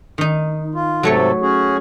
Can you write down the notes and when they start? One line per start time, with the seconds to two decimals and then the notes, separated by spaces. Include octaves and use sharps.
0.18 D#3 D#4
0.75 F4
1.03 G#2 C3 F#3 A3 A4 C#5
1.42 C#4 F#4 G#4